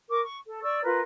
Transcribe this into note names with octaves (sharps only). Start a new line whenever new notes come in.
A#4 C#6 D6
C#6
A4
D5 C#6 E6
F4 A#4 B4